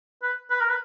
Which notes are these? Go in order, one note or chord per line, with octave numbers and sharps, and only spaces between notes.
B4
B4
A#4
B4